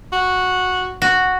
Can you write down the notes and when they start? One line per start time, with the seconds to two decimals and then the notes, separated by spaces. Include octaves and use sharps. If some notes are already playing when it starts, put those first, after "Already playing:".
0.12 F#4
1.02 F#4